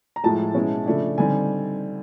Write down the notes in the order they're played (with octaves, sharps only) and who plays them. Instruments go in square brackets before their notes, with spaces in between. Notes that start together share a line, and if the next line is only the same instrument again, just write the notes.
[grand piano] A#5
A2 F3 G#3 A5
B2 G#3 C#4 E4
C#3 F3 A3 D4
D3 G3 C4 D#4 G#5